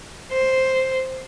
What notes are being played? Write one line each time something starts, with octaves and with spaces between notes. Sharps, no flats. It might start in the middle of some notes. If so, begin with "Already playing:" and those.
C5